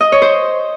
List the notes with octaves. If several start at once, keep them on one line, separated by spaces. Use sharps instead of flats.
D#5
C#5
C5